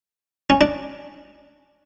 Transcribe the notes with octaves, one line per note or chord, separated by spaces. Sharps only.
C#4
D4